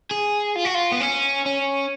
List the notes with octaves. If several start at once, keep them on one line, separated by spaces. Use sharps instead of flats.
G#4
F4
F#4
F4
B3
C#4
C#4